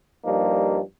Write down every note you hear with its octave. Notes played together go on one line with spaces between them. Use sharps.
G2 F3 G3 A#3 D#4